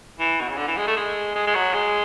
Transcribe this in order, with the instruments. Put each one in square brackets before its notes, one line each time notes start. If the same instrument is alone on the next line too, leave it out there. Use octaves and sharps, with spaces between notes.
[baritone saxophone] E3
B2
C#3
D3
E3
G#3
A3
G#3
G#3
G#3
F#3
G#3